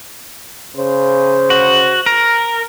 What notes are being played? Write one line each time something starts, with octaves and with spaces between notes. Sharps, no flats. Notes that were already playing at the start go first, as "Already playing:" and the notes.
C#3 C5
F#4
A#4